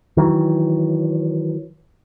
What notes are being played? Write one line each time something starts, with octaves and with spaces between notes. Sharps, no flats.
D#3 E3 F#3